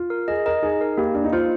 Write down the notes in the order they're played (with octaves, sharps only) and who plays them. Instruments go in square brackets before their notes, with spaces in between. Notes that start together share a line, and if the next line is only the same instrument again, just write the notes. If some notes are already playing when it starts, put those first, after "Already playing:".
Already playing: [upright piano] F4
[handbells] A#4
[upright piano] G#4 [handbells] D#5
[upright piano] A#4 [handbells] D#5
[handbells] D#4 [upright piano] G#4
[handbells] A#4
[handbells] A#3 [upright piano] G4
[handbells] A#3 [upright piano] D4
[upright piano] D#4
[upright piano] F4 [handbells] C5